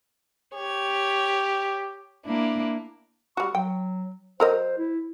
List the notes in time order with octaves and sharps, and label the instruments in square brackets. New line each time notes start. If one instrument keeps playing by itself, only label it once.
[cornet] G4 [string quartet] C#5
[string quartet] A#3 D4 E4
[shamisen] G3 F#4 [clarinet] C#6
[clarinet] F#3 [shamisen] G5
[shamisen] F#3 A#4 D#5 [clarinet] C5
[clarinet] E4